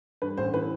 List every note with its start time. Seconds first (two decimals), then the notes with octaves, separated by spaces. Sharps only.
0.22 G2 B4
0.37 A1 C5
0.54 E3 B4